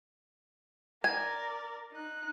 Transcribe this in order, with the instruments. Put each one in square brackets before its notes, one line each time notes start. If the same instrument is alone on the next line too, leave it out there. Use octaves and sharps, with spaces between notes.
[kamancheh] A#4 D5 [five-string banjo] G#5
[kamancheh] D#4 F#6